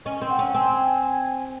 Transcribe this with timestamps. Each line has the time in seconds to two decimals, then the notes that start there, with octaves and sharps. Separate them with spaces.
0.05 C#4 D#5
0.22 C4
0.30 F#5
0.39 C#4
0.55 C4 G#5